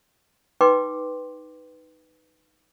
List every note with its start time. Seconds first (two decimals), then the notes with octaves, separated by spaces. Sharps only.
0.61 D#4 B4 G5 C6 D6